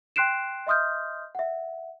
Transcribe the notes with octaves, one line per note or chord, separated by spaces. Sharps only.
G5 C6 F#6 C7 D7 E7
D#5 E5 C6 D#6 F6 G6
E5 F#5